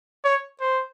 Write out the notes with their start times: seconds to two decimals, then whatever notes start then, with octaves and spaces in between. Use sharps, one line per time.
0.24 C#5
0.61 C5